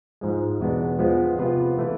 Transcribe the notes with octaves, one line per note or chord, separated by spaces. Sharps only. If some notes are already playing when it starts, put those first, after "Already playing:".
G#2 F3 G#3
E2 B2 G#3 B3 D4
F3 G#3 B3 F4
C3 F3 B3 F4 B4
E3 A3 E4 B4